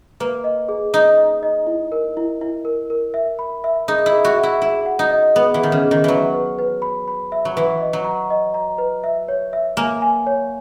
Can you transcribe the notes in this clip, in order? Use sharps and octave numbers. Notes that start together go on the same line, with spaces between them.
A#3 B4
D#5
G#4
D#4 D#5
D#5
D#5
E4
A#4
E4
E4
A#4
A#4
E5
B5
E5
D#4 G#4
E4
G#4
F#4
E5
E4
E4 G#4
F#5
D#4
D#5
B3 G#4
E3
D#3 G#4
C#3
G#4
D#3
E3 F#3 B4
B4
B4
B5
B5
E5
F#3
E3 B4
D#5
F#3
A#5
D#5
A#5
B4
E5
C#5
E5
A#3 G#5
G#5
C#5